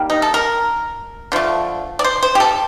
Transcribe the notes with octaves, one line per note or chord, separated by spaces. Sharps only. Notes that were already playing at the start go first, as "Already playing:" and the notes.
Already playing: D#3 G3 A#3
D#4
A4
A#4
D3 F3 A3
D5
C5
C5
G4
A4